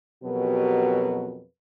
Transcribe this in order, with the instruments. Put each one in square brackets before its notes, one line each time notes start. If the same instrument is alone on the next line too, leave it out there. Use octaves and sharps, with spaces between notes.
[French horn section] F2 B2 F#3 G4 A#4 B4